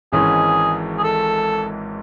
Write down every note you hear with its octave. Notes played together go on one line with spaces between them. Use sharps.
G#1 G#2 E3 G#3 C#4 G#4
G#4
A4